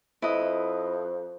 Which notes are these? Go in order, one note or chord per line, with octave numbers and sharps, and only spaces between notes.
F2 E4 B4 D#5